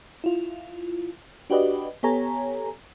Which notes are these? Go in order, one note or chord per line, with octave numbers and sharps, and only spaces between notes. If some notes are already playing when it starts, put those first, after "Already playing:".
E4 F4
D4 F#4 G4 B4 D5 D#5
B3 G4 A4 C#5 G#5 A#5